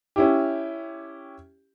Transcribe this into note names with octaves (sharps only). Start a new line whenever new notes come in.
C#4 E4 G4